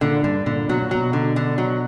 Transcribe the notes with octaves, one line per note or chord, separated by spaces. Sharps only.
A#2 D3
G2 D3
A#2 D3
B2 F#3
A#2
B2 F#3
D3
D3
F#3